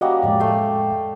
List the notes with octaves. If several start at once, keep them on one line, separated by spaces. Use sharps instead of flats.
G3 A#3 C#4 F#4 D#5 F#5
F2 A2 G#3 D5
A3 F5 G5